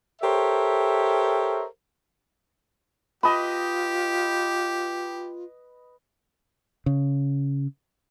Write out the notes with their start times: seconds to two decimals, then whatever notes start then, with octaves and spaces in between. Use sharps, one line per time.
0.22 G4 A4 A#4 C5 C#5 E5
3.23 F4 G4 B4 D#5 A5 B5
6.86 C#3